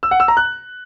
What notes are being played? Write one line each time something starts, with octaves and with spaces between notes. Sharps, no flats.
E6
F#5
E6
A#5
F#6